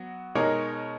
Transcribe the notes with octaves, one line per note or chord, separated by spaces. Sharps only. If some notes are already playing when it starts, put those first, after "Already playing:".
Already playing: F#3 B3 F#4
B2 G#3 D#4 A#4 C#5